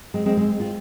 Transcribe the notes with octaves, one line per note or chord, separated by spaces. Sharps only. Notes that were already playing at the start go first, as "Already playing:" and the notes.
G#3 C4
G#3 C4
G#3 C4
C4 F4